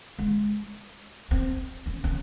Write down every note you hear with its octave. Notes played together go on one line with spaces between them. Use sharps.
G#3
C4
C#4
C#4